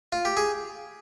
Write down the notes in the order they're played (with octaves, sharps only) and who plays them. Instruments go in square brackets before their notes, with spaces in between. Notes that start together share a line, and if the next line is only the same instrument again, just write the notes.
[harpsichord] F4
G4
G#4